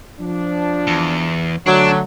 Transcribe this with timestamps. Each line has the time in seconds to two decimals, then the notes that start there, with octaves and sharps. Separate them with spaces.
0.20 F3 D4
0.87 E2
1.66 D3 F#3 A3 D4